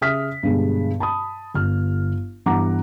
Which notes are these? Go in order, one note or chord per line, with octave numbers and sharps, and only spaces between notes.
C#3 E5 D#6 F6 B6
G2 B2 D3 G#3
A5 B5 D#6
G1 F6
G2 E3 B3 F#5 A#5 D6